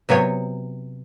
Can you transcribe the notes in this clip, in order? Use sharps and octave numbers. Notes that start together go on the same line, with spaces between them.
C3 F#3 B3 C#5